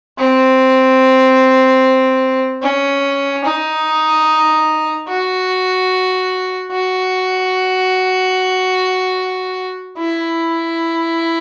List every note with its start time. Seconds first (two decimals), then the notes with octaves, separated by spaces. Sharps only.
0.18 C4
2.62 C#4
3.45 D#4
5.09 F#4
6.72 F#4
9.98 E4